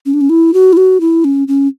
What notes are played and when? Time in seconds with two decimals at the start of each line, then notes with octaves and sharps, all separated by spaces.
0.06 C#4
0.14 D4
0.21 C#4
0.30 E4
0.54 F#4
0.73 E4
0.77 F#4
1.01 E4
1.24 C#4
1.48 C#4